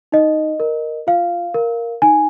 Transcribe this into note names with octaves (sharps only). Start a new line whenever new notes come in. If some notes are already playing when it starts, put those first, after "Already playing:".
D#4 D#5
A#4
F4 F5
A#4
D#4 G#5